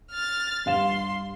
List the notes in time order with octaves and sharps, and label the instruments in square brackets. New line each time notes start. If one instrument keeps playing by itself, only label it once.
[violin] F6 A6
[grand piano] G2 F5 E7 [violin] C6